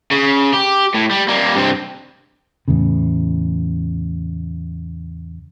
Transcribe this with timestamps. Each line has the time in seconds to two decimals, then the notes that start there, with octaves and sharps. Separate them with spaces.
0.11 C#3
0.53 G4
0.95 A2
1.11 G3
1.28 G3 A#3
1.56 G2 C4
2.68 E2 A2 C#3